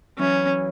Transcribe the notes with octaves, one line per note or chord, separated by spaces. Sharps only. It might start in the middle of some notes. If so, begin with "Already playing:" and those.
E3 F#3 C#4